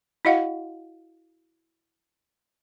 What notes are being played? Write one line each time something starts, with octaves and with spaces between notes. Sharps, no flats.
E4 F#4 D#5 F5 F#5